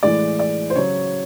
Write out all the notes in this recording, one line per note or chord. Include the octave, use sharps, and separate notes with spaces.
A2 E3 G#3 D5
D5
C5
C#3 F#3 C#5